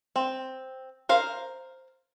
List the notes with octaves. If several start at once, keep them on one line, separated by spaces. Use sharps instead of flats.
C4
A#4 C5 F5